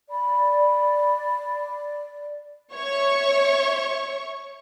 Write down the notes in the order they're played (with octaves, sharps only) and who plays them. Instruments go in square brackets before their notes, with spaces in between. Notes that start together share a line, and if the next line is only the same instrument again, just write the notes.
[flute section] D5 [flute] B5
[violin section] C#5 E5 C#6